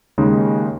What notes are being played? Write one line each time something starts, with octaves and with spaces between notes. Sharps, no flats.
D#2 C#3 G#3 D#4